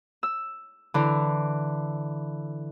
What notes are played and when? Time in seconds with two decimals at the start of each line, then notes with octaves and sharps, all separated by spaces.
0.23 E6
0.94 D3 E3